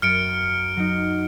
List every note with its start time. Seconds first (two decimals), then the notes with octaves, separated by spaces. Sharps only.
0.02 F#2 F6 A6 C#7 D7
0.77 F#3 D#4